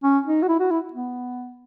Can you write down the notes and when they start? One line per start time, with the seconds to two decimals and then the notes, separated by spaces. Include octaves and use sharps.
0.03 C#4
0.26 D#4
0.43 F#4
0.48 E4
0.60 F#4
0.71 E4
0.93 B3